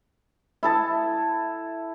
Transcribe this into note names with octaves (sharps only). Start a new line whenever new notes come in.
E4 A4 A5